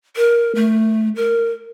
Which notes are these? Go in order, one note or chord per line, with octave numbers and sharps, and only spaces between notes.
A#4
A3
A#4